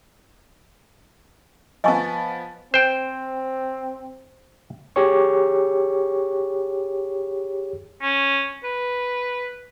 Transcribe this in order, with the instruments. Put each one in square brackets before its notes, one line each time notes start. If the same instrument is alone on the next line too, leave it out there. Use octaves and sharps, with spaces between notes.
[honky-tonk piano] F3 B3 [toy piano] D#5 G#5 C#6
[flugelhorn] C4 [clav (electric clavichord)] C5 G5
[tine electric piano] G4 G#4 C#5 C#6
[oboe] C#4
B4